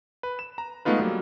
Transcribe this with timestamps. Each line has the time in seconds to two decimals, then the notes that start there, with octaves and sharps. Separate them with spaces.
0.23 B4
0.39 E7
0.58 A#5
0.85 G#3 A3 B3 D#4 F4 B4
0.99 F#3 G3 A#3